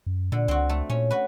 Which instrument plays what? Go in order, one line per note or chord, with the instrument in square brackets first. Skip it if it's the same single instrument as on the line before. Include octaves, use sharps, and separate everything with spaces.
[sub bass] F#2
[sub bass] A#2 [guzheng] D3
[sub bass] C#2 [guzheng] C4 F#4
[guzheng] A3
[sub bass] A#2 [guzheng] C#4
[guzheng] F#4 B4